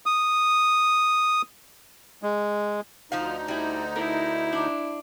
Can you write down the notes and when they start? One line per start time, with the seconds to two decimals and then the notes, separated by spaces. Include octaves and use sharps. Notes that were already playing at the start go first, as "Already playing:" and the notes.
0.06 D#6
2.23 G#3
3.12 D2 F3 D#4 C5 F5
3.48 G3 E4
3.96 E4 A#4
4.53 D4